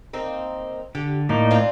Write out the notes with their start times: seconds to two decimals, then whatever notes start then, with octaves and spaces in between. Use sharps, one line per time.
0.13 A#3 C4 D#4
0.95 D3 G4
1.29 A2 A#3 D#4 D5
1.51 C4 D4 F4